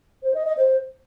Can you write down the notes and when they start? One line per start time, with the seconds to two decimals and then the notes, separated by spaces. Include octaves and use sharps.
0.23 C5
0.34 D#5
0.46 D#5
0.57 C5